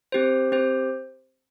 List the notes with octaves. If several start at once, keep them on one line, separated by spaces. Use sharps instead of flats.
C4 G4 C5
C4 G4 C5